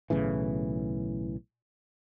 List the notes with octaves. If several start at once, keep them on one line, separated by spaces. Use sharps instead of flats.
B1 A2 C#3 E3